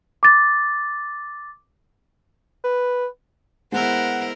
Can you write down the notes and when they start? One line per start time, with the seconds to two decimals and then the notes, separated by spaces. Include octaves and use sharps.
0.23 D6 A6
2.64 B4
3.72 G#3 B3 E4 A#4 C5 F#5 E6